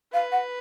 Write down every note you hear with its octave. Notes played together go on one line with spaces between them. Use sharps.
B4 F5
F#5